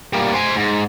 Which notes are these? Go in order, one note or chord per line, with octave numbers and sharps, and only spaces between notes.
G3 A#3
C5 G#5
G#2